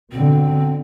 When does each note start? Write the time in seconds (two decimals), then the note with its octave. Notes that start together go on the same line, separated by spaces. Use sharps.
0.13 B2 D3 C4